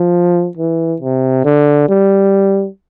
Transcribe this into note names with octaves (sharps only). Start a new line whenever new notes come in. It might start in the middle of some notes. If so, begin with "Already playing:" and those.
Already playing: F3
E3
C3
D3
G3